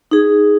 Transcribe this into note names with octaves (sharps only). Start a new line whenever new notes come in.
D#4 G#4